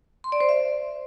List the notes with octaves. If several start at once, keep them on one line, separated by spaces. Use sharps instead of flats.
C6
D5
C5
E5